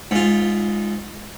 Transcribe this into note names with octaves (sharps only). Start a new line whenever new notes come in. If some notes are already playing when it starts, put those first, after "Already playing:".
G#2 F4